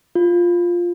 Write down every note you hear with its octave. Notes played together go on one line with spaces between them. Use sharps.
F4